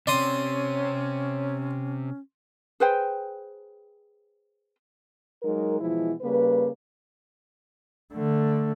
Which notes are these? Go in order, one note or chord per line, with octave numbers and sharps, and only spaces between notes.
C3 C4 C#4 C#5 D5 C6 D#6
G#4 B4 C5 G5
F#3 G#3 D#4 A#4
B2 E3 F3 G#3 E4
C#3 G3 A#3 B4
D3 A3